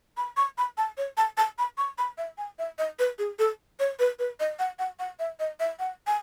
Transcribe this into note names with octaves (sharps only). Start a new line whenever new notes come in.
B5
C#6
B5
A5
C#5
A5
A5
B5
C#6
B5
E5
G#5
E5
D#5
B4
G#4
A4
C#5
B4
B4
D#5
F#5
F#5
F#5
E5
D#5
E5
F#5
G#5